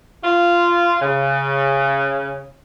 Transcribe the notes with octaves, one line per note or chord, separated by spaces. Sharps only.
F4
C#3